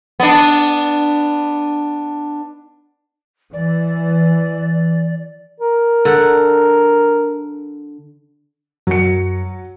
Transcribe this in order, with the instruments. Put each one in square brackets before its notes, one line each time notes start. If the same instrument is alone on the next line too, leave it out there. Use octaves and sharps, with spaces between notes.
[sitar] B3 D4
[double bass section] E3 [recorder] D5
[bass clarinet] A#4
[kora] D3 F#5
[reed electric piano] F#2 [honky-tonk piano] F#3 C#7